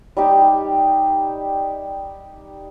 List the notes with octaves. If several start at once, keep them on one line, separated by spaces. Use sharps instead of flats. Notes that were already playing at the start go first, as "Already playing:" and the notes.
G3 D#4 G4